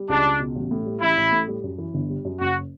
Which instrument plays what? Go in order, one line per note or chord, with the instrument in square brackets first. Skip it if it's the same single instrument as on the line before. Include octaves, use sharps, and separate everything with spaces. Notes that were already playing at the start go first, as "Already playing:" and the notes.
Already playing: [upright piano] G3
[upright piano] C#2 [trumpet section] D4
[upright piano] C#2
B2
A1
A2
G3
[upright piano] A1 [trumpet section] E4
[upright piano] A1
A2
G3
F#2
E3
G1
G3
F#2
[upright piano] F#1 [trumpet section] F#4